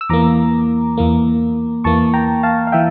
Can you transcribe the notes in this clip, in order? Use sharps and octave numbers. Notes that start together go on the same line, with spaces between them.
E6
E2 E3 A#3 A#5 D6
E2 E3 A#3
E2 E3 A#3 A5 C#6
G5 A#5
F5 A5
F5
E3 E5 G5